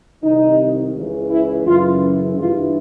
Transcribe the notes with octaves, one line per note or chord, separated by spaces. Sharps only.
C2 C3 D#3 D#4
C#2 C#3 E3
E4
F#2 C#3 E3 F4
G2 E3 F4